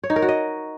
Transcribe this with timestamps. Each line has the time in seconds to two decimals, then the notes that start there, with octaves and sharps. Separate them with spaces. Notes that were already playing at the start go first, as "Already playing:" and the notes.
0.04 C#5
0.10 D#4
0.16 A#4
0.22 F#4
0.29 D#5